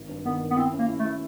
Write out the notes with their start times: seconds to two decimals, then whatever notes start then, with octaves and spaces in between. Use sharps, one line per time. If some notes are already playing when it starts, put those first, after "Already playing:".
Already playing: G#1
0.09 G2
0.25 D#3 B3
0.41 D#3
0.51 B3
0.57 C4 E4
0.73 C#4
0.79 A#3
0.88 E4
0.99 A3
1.05 E4